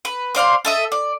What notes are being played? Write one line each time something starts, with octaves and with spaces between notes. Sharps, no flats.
B4
C5 D5 F5 C6
A4 D#5 E5
D5